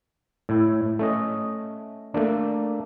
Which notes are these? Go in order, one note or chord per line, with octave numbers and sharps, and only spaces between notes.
A2 E4
A3 C#4 D#5
A3 A#3 D4